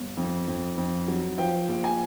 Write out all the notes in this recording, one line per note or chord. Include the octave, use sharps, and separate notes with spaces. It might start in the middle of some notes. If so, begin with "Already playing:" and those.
Already playing: G1
F2
F2
F2
F#3
F3 G5
A#1
G#5